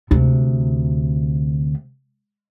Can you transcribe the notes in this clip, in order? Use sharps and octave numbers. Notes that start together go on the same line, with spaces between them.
D2 C3